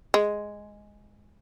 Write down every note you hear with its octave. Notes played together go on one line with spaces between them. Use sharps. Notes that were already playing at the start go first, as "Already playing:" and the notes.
G#3